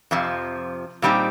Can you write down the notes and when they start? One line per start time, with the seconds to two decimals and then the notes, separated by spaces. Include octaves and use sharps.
0.11 F2 C3 F3
1.02 A#2 G3 C4 D#4 G4